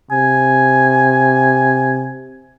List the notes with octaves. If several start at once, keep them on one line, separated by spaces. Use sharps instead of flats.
C3 G#5